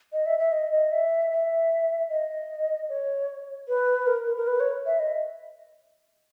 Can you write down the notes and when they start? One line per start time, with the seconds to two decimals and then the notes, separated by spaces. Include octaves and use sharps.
0.13 D#5
0.26 E5
0.39 E5
0.52 D#5
0.72 D#5
0.92 E5
1.31 E5
2.09 D#5
2.89 C#5
3.68 B4
4.07 A#4
4.27 A#4
4.37 A#4
4.47 B4
4.60 C#5
4.86 E5
4.99 D#5